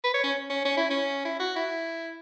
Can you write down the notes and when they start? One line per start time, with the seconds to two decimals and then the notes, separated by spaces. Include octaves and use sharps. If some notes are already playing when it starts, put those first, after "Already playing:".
0.04 B4
0.14 C#5
0.23 C#4
0.50 C#4
0.65 C#4
0.77 E4
0.90 C#4
1.25 E4
1.40 F#4
1.56 E4